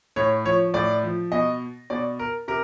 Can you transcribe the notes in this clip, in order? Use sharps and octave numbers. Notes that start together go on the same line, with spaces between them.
A2 C#5
F3 C#5
A2 D5
F3
B2 D#5
B2 D5
A#4
C3 A#4